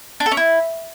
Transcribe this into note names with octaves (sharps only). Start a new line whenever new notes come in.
D4
A4
C#4
E4